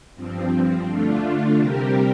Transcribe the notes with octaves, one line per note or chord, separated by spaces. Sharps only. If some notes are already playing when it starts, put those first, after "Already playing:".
G2 F3 C4
D3 A3 D4 F4
C3 G3 C4 G4 A#4